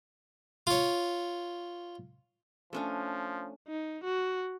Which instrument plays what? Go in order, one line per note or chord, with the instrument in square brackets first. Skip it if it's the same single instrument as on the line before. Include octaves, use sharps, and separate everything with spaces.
[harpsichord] F4 C#5
[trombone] F3 [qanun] A3 C#4 D4
[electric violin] D#4
F#4